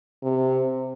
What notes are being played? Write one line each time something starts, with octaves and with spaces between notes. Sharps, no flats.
C3